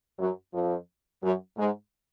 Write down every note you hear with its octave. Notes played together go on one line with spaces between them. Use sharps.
F#2 F#3
F2 F3
F#2 F#3
G#2 G#3